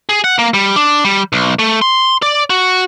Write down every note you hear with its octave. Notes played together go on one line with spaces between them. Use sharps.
G#4
F#5
A#3
G3
D4
G3
B1
A3
C6
D5
F#4